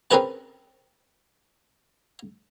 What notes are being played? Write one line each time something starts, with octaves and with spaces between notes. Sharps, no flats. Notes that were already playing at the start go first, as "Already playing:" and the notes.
C4 C#4 G#4 A#4 B4 A5